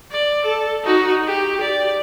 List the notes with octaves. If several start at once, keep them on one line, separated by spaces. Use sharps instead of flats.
D5
A4
D#4 F#4
G4
D5